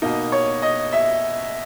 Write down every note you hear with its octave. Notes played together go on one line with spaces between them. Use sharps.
B2 A#3 D#4
C#5
D#5
E5